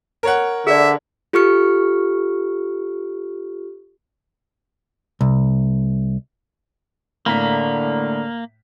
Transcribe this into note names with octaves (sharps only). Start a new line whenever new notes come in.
A#4 C#5 F#5
D3 G#4 D5 E5
F4 G4 A4 C#6 F6 C#7
C2
A2 D3 A#3 A#5 B6